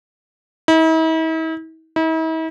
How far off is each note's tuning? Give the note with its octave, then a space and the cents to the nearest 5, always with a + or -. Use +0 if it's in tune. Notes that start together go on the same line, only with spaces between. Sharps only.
E4 -45
E4 -45